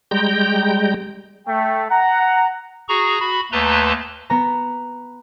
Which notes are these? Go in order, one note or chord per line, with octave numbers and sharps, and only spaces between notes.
G3 G#3 G5 A#5 G6
A3 G5
F#5 A#5
F#4 G#4 A#5 C#6
F#4 B5
D#2 A3 B4 A5 A#5 C6
B3 A#5